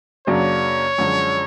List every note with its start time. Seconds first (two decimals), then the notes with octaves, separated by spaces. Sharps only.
0.27 F#2 C#3 F#3 A#3 D4 C#5
0.98 F#2 D3 F3 G#3